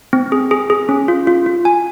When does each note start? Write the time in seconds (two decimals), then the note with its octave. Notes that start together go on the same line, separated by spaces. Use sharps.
0.13 C4
0.32 G#4
0.51 G#4
0.70 G#4
0.89 C#4
1.08 F4
1.27 F4
1.46 F4
1.65 G#5